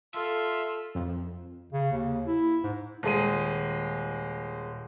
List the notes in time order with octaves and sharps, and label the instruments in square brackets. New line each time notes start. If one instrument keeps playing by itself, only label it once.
[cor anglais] F4 [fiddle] A4 [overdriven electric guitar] E5
[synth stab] F2
[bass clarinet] C#3
D#2
E4
G#2
[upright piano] D#1 G#3 D#7